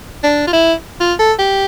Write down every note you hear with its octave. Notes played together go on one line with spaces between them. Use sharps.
D4
F4
E4
F4
A4
G4